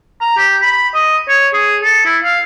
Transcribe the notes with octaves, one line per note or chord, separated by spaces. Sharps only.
A#5
G4
B5
D#5
C#5
G#4
A4
E4
F5